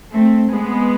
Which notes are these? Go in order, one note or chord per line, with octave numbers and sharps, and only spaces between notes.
A3 C4
G#3 B3